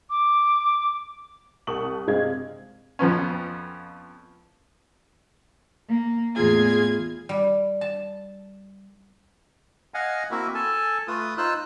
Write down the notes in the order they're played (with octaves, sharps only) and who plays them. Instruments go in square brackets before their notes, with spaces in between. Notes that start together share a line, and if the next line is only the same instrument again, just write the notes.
[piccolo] D6
[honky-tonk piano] C2 A5 C#6 D#6 F#7
G2 C3 G#3 C4 F5 G#6
[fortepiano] F2 F3 B3 C#4
[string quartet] A#3
E2 A2 F4 G#4 G#6
[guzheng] G3
A5
[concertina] D#5 F5 F#5 G#5
A#3 C4 E4 F#4 A#4 E5
A4 G#5 A5
A3 F4 B4 D#6
D#4 F4 C5 E6 F#6